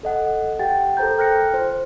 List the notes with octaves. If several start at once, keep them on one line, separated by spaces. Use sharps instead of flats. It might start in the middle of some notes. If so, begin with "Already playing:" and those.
A4 D#5 F#5
G4 F#5 G5 A6
A4 A#4 C5 A#5 G6
G5 F6 F#6 A#6 C#7
F4 C5